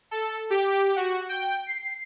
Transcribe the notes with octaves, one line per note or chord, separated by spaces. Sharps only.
A4
G4
F#4
G5
C7